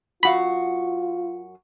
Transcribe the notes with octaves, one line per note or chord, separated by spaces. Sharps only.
F#2 F4 F#4 F5 B5